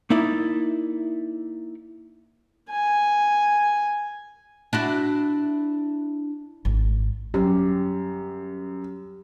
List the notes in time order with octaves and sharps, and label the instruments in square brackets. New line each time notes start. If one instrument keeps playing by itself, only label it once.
[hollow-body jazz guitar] A#3 D#4 E4 D5
[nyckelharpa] G#5
[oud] D4 E4 F#4
[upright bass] G#1
[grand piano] F#2 [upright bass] D3 [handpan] G4